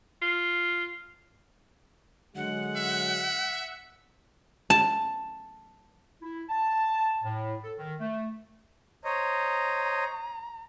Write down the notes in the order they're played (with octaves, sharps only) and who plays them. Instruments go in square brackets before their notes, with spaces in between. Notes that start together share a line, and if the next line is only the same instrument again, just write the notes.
[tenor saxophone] F4
[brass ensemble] D3 F#3 G#3 [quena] F#5
[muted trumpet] E5
[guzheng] A5
[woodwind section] E4
A5
A2
A4
D#3
A3
[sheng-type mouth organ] C5 C#5 D#5 [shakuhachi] A#5